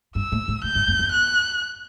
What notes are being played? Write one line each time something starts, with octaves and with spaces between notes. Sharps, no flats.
G2 E6
A2
A2
A2 G6
G2
F#2
E2
F#6